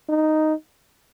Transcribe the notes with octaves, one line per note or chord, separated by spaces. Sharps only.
D#4